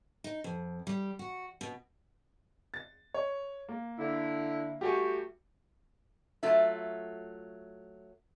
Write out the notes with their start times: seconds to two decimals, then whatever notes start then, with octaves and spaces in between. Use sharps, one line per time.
0.24 D#4
0.44 F2
0.87 G3
1.19 F#4
1.61 B2
2.74 A6
3.14 C#5
3.69 A#3
3.98 D3 E4
4.81 G3 A3 F#4 G4 G#5
6.43 F#3 A3 F4 E5